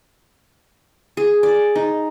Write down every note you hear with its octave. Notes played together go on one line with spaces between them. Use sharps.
G#4
D5
D#4